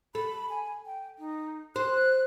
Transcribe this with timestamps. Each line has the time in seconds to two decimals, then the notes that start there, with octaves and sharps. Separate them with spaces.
0.15 A4 B5
0.50 G#5
0.86 G5
1.18 D#4
1.76 C5 F#6